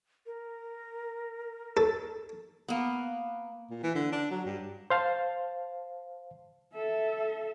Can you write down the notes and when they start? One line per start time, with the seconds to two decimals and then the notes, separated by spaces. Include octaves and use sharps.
0.26 A#4
1.77 A4
2.68 A#3 B3
3.70 A#2
3.83 E3
3.95 D3
4.12 D4
4.30 F#3
4.45 G2
4.90 C5 F5 A5
6.73 A4 E5